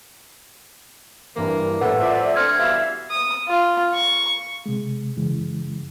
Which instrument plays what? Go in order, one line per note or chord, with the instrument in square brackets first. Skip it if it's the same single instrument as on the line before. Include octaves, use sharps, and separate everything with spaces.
[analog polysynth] G2 E3 [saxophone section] C3 A#3
[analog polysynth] A2 [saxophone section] A3 [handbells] B4 F#5
[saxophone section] F2 F3 A3 [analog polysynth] D5 E5
[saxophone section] D3 A3 C4 [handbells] F6 G#6 [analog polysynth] C#7
[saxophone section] B2 E3 G3 [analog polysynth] E5 F5
[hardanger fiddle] D#6
F4
C#6
[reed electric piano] C3 G#3
F#2 C#3 E3 G#3